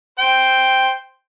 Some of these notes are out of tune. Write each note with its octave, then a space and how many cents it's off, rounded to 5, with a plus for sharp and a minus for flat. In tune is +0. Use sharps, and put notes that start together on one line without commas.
C5 +0 G5 +0